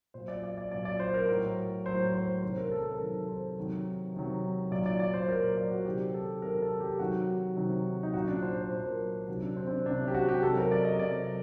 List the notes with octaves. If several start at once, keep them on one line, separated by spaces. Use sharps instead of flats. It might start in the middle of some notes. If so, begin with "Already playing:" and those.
A#2 F#3 C5
D5
D5
D5
A#2 F#3 D5
D5
C5
A#4
A2 F#3
A2 F#3 C5
C5
C3 D#3 F#3 C5
A#4
A4
A#4
C3 D#3 F#3 A4
C5
C3 D#3 F#3
C3 D#3 F#3
A#2 F#3 D5
D5
D5
C5
A#2 F#3 A#4
D5
F#4
C3 D#3 F#3 G4
A4
C3 D#3 F#3 A#4
A4
G4
C3 D#3 F#3 F#4
C3 D#3 F#3
D#4
A#2 F#3 F#4
D4
C5
C5
A#2 F#3 C5
A#4
C3 D#3 F#3 F#4
D4
C4
C4
D4
C3 D#3 F#3 D4
G4
F#4
G4
C3 F#3 A4
A#4
D5
D#5
C3 F#3 D5